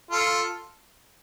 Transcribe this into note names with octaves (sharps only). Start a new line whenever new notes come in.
F4 A4